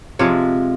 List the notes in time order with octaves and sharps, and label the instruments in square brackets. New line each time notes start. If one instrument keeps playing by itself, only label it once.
[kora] C3 F3 G#3 C#5